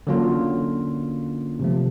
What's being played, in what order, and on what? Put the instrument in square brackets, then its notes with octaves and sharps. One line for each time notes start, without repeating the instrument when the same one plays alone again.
[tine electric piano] D3 F#3 A#3 C#4 F4
C3 F3 A3